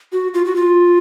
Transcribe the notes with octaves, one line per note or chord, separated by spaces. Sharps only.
F#4
F4
F#4
F4